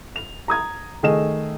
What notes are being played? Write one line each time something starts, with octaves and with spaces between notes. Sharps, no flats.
F7
A#5 D#6 G#6
D#3 A3 G#4 D#5 E7